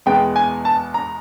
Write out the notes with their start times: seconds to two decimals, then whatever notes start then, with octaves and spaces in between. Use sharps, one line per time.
0.06 E2 B2 G#3 B3 G5
0.36 G#5
0.65 A5
0.94 A#5